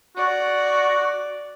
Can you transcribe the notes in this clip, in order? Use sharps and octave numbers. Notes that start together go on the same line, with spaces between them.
F#4 D5